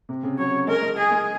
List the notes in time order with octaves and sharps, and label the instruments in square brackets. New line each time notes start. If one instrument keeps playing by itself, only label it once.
[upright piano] C3
C#3
[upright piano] F#3 [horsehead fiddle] C#5
[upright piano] G#3 [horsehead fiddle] A#4
[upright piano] G#3
[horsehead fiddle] G#4
[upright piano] G#3